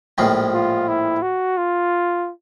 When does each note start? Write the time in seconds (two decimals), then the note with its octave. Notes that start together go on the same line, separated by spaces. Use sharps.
0.18 A#1 A2 F3 G#3 C4
0.54 F4
0.88 E4
1.22 F#4
1.58 F4